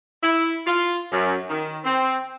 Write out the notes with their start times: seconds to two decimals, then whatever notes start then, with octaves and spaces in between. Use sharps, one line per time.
0.23 E4
0.67 F4
1.12 F#2
1.49 D#3
1.84 C4